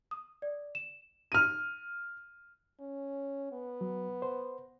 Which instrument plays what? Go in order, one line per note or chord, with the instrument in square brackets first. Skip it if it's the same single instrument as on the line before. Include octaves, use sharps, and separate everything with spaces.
[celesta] D#6
D5
E7
[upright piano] F6 D#7
[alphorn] C#4
B3
[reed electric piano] F#3
C5